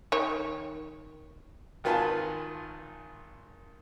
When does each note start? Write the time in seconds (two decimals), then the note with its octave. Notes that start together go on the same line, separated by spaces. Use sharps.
0.12 D#3 C#5
1.84 G#1 D#3 F4 B4 G#5 A5